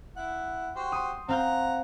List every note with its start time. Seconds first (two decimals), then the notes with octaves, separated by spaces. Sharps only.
0.16 E4 F#5
0.75 F#4 G4 C5
0.92 C6 D#6
1.28 C4 F5 F#5 A#5 G6